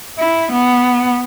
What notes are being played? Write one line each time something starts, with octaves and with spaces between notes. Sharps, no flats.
E4
B3